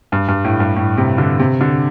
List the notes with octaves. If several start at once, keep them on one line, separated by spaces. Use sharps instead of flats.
G2
G2
A2
G2
A2
C3
D3
C3
D3